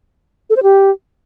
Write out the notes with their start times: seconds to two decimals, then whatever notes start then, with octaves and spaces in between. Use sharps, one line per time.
0.50 A4
0.56 C5
0.63 G4